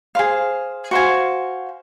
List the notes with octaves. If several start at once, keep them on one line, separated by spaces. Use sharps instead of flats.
G#4 C5 F5
F#4 C5 F5 G#5